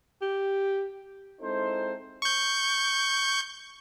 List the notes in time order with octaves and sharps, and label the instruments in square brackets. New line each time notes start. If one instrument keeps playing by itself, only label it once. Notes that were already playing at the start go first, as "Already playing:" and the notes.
[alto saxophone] G4
[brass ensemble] G#3 C4 D#4 E4 A4 C5
[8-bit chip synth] C#6 G6